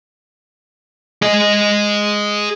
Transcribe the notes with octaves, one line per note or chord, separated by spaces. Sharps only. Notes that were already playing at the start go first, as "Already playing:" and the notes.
G#4 D#5